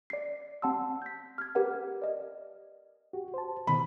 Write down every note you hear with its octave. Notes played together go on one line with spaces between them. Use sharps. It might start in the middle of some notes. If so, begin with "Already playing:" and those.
D5 C7
C4 F#5 A5 C6 E6
G6 B6
F6 G#6
G4 A#4 B4 F#5
D5 D#5
F#4 G4
C5 A5
B2 D#3 B3 B5